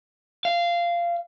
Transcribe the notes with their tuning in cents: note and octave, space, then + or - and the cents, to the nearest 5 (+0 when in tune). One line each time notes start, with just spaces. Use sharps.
F5 -15